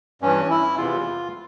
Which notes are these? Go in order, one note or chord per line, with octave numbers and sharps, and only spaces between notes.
G2 E3 C#4
E4
E2 C3 E3 F4